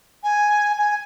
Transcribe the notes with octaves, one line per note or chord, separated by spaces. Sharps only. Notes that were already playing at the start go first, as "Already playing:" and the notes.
G#5
G#5